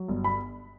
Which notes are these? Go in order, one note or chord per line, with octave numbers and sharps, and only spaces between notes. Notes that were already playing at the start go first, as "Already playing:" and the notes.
Already playing: F#3
G1
B5